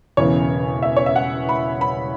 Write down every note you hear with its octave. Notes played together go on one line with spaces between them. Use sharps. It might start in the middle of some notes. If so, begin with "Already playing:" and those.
E1 E2 C#3 E3 C#5
E5
C#5
E5
F#5
B5
B5